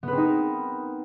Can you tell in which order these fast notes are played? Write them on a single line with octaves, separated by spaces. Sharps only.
B3 B4 C4 D#4 A#4